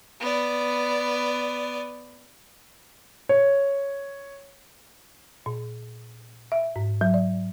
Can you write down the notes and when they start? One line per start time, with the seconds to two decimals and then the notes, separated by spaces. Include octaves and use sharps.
0.20 B3 D5
3.29 C#5
5.46 A#2
6.52 E5
6.76 G#2
7.01 F#3
7.14 D5